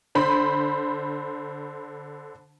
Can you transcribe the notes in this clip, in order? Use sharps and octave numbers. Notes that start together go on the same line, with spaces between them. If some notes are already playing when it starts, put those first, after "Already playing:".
D3 C5 B5